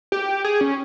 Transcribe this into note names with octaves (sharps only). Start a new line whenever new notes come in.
G4
G#4
C#4